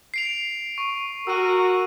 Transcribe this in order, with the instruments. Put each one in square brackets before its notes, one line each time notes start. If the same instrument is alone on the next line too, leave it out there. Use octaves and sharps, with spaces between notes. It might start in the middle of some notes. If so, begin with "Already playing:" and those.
[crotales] C7 D7 F7
C#6
[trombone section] F#4 A#4 [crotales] E6 D#7